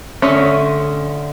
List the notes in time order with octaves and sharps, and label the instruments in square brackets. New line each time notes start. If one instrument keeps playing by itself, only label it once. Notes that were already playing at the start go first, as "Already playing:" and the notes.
[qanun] D3 A3 C#6 [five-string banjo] C#4 [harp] E5 C6 D#6